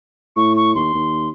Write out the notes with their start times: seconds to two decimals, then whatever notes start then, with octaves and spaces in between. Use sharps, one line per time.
0.36 A2 C#6
0.56 C#6
0.75 D#2 C6
0.94 D#2